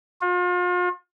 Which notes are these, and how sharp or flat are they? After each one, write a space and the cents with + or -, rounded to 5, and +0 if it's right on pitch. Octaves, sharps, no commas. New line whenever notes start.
F4 +40